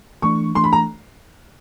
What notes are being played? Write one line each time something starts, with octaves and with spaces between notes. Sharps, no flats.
E3 A3 D4 C#6
E3 A3 D4 C6
B5
A#5